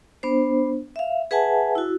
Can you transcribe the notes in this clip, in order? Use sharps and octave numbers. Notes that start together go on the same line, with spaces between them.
B3 D4 C5
E5 F5
G#4 B4 E5 F#5 G#5 A5
E4 F#4